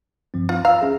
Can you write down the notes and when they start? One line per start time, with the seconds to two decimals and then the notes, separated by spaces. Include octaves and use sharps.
0.34 G2 F3 C4
0.49 F4
0.65 F5 A#5 E6
0.81 C#4 G#4 E5